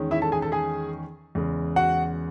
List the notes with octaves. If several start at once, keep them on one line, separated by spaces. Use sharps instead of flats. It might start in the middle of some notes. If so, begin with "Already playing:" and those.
Already playing: E2 D#3 G#3 C#4
E4 E5
A4 A5
G#4 G#5
A4 A5
G#4 G#5
E2 C#3 G#3
F#4 F#5